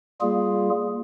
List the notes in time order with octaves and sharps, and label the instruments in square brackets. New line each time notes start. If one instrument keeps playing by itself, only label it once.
[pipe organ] G3 A#3 F4 G#4